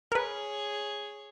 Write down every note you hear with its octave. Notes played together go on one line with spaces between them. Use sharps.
G#4 A#4 B4 C#5